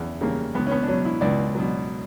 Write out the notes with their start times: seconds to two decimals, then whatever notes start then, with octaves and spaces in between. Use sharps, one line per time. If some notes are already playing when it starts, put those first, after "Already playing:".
Already playing: E2 C#3
0.21 C#3 G3 A#3
0.54 C#2 B3
0.67 C#4
0.71 B3
0.83 D4
0.88 B2 F#3 C#4
1.05 E4
1.21 C#2 D5
1.55 B2 F#3